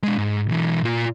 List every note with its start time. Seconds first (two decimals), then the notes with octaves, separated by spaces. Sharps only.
0.04 G#3 D4
0.18 G#2
0.48 B1 E3
0.83 A#2 F4